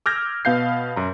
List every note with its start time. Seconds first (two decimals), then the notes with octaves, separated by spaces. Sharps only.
0.06 D6 E6 F6 G6 G#6 A#6
0.45 B2 B3 F5 G6 C7
0.96 F#2 A#5